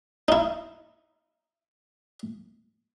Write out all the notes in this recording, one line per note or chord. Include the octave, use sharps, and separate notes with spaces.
D#4 E4